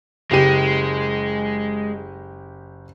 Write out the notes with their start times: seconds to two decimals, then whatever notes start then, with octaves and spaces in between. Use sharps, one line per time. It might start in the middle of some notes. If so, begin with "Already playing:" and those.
0.31 F#1 G#3 G4 D#7